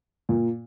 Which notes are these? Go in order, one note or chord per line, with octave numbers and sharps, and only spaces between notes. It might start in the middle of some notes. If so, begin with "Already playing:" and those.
A#2